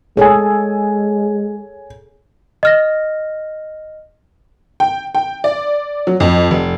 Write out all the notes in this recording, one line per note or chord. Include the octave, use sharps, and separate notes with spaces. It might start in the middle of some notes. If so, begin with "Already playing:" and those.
G#3 G#4 A4 C#5 G#5
D#5 F6 A#6
G5
G5
D5
F#3
F2
F1